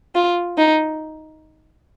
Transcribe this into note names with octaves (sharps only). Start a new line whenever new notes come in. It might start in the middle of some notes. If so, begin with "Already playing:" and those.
F4
D#4